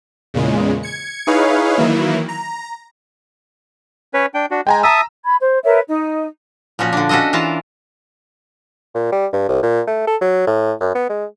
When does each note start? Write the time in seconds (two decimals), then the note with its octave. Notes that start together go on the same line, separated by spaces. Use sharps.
0.34 E2 A#2 C#3 G#3
0.83 G#6 C#7
1.27 D#4 E4 G#4 B4 C#5 F5
1.77 D#3 E3 F#3 A#3 E4
2.29 A#5
4.14 C#4 B4 C#5
4.34 D4 G5
4.51 D4 F#4
4.67 G#3 G5 G#5 A#5
4.83 E5 A5 A#5 D#6 E6
5.24 B5 G#6
5.41 C5
5.64 A#4 B4 C#5 E5
5.89 D#4 D#5
6.79 A#2 F3 C#4 F#4
6.93 D3 D4
7.09 C#4 D4 F#4 A4 D#5
7.33 E3 F4 A#4 A5
8.95 A#2
9.12 G3
9.33 G2
9.48 C2
9.63 A#2
9.87 A3
10.07 A4
10.21 F#3
10.47 A2
10.81 F#2
10.95 B3
11.10 G#3